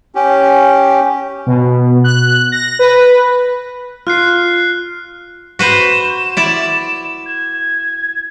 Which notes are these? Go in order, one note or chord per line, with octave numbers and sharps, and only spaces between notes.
C#4 G4
B2
F#6
A#6
B4
B4
F4 F6 F#6 C7
F#4 B4 C5 E7
E4 D5
G#6